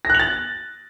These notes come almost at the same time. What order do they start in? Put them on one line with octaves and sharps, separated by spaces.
A#6 F#6 F#7 A6